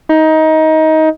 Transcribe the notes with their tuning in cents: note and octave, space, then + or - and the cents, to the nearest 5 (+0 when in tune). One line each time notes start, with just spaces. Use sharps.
D#4 +20